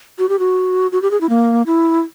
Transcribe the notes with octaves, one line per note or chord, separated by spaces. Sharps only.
F#4
G4
F#4
F#4
G4
G#4
E4
A#3
E4